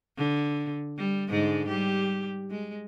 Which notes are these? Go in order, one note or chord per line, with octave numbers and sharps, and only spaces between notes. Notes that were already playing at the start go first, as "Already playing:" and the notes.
D3
G3
G#2 D3 G#3
G3 G4
G#3